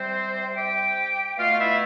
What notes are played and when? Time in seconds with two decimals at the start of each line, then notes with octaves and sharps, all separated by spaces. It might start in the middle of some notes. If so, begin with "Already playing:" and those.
Already playing: C3 G3 C4 C5
0.55 G4 G5
1.37 B2 A3 F4 F5
1.58 E4 E5